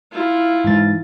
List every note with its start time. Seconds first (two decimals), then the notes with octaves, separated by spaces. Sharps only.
0.11 E4 F4
0.64 G#2 E3 A6